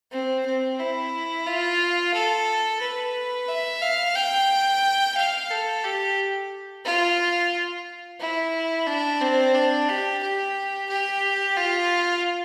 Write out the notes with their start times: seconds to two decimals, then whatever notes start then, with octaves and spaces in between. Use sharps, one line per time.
0.11 C4
0.45 C4
0.79 E4
1.46 F4
2.13 A4
2.81 B4
3.48 E5
3.82 F5
4.15 G5
5.17 F5
5.50 A4
5.83 G4
6.85 F4
8.20 E4
8.87 D4
9.21 C4
9.54 D4
9.89 G4
10.22 G4
10.89 G4
11.57 F4